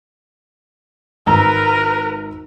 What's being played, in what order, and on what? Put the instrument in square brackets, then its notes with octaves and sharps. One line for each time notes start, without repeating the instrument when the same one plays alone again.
[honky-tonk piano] G#1 A#5 E6 [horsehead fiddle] A#4 B4